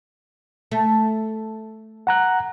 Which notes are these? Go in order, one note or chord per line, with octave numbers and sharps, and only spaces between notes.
A3
F#5 A#5 F#6